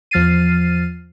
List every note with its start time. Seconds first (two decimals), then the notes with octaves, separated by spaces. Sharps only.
0.11 E2 F3 F6 A6 C7 D#7